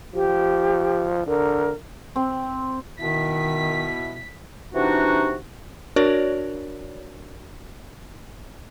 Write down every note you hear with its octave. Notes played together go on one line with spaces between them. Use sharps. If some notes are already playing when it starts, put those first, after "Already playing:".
F3 G4
D3 A#4
C4
B2 D#3 E4 B6
C3 E3 D4 D#4 F#4
D4 F#4 A#4 C#5 D5